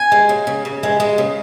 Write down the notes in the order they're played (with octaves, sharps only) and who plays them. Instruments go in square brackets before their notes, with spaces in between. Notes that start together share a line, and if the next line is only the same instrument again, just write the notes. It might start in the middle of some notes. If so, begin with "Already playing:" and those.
Already playing: [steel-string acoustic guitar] G#5
G#3
C#3
C#3
C#3
G#3
G#3
C#3